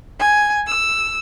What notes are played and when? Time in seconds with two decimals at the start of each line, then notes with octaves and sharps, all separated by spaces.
0.19 G#5
0.67 E6